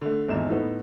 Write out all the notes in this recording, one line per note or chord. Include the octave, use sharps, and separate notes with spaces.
D3 A3
G#1 E2 E5 E7
A2 B3 D#4 A4